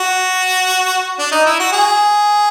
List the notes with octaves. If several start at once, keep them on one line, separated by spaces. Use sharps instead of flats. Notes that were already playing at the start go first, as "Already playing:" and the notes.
Already playing: F#4
D4
D#4
E4
F#4
G#4